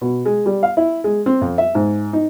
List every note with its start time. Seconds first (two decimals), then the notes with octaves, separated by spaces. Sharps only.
0.01 B2
0.26 G#3
0.46 G3
0.63 F5
0.77 E4
1.04 G#3
1.26 C4
1.41 F2
1.58 E5
1.75 G#2
2.13 D#4